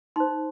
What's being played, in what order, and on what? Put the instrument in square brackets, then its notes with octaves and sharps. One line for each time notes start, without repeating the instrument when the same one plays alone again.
[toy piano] D#4 C5 C6